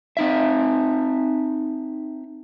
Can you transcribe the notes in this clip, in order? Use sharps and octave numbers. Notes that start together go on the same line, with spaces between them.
C4 D#4 E5